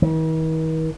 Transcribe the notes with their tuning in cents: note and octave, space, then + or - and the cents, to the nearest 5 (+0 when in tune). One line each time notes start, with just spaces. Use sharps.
D#3 +45